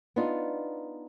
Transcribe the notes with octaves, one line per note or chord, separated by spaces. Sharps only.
B3 D4 D#4 F4